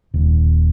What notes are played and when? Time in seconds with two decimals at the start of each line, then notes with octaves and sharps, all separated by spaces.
0.14 D#1